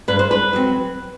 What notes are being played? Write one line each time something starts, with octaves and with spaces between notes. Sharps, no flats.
G2 B4
C5
B4
F#3 C4